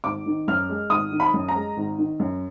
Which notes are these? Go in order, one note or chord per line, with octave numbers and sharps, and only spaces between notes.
G#1 D6
D#3
F#2 F6
G#3
G#1 D#6
D#3
B5
F#2
A#5
G#3
G#1
D#3
F#2